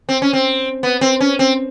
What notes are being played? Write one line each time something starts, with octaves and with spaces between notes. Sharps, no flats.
C4
C#4
C4
B3
C4
C#4
C4